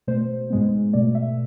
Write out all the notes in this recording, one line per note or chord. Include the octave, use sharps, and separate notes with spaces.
B2 A3 C5
G#2 G#3 B3
B2 A3 D5
E5